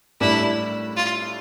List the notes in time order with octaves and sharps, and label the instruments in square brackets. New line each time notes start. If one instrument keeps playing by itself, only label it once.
[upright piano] A2 G3 D4 [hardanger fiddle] E4
[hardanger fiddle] F4